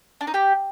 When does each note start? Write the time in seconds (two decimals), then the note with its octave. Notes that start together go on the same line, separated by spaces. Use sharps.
0.21 D4
0.27 D#4
0.34 G4